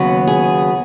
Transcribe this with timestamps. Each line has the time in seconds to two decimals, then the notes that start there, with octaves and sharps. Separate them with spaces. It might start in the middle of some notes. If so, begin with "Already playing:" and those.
Already playing: D#2 C#3 F#3 B3
0.27 G#4